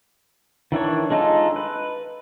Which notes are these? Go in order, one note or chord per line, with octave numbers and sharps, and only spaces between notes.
D#3 E3 D4 C#5
G#3 D4 D#4 F4 A4
B4